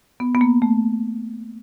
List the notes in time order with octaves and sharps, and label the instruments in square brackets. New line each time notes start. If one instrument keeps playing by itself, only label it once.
[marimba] B3
B3
A#3
A3